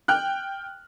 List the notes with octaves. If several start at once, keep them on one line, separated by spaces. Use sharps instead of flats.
G5 F6 F#6